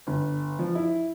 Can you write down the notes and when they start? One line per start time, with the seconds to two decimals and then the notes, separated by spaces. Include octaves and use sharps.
0.07 G1
0.59 F3
0.75 E4